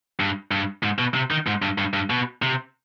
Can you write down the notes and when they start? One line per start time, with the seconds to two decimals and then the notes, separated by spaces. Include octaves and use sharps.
0.20 G2
0.51 G2
0.83 G#2
0.99 B2
1.14 C3
1.31 D#3
1.47 G#2
1.62 G2
1.78 G2
1.94 G2
2.10 B2
2.42 C3